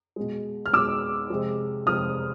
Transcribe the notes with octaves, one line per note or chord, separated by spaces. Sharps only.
B2 G#3
F6
B2 G#3 D6 E6
C3 F3 G#3
C3 F3 G#3 D#6 F6